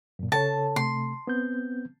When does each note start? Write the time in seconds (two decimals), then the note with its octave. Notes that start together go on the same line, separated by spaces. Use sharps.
0.19 F#2 A#2
0.32 C#3 A4 C#5 A5
0.76 C3 A3 C6
1.27 B3 C4 G6